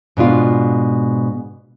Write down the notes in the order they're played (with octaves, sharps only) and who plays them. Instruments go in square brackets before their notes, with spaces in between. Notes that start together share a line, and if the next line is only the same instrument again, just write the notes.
[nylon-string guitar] G#2 B2 D4 F4